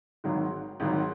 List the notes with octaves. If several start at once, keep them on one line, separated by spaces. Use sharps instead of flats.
G#1 G#2 D#3 F#3
G#1 G#2 D#3 F#3